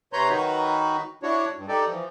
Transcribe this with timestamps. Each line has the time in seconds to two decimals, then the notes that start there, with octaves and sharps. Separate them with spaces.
0.13 C3 B4 C#5 A#5 C6 G6
0.30 D#3 F#3 D#4 F#4 B4
1.23 D4 E4 F#4 C#5
1.57 G2
1.69 D#4 G4 A4 D5
1.87 E3 F3